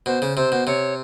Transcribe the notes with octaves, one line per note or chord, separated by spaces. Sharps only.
B2 C5
C#3
C3 C5
B2
C3 C#5